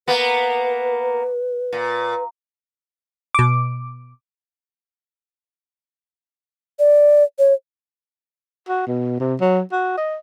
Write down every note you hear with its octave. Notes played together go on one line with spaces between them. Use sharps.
A#3 B3 B4
A#2
B2 D6
D5
C#5
F#4
B2
C3
F#3
F#4
D#5